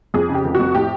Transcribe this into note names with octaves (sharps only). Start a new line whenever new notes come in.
F2 G#4
C#3
G4
F1
F2 F#4
A2 G4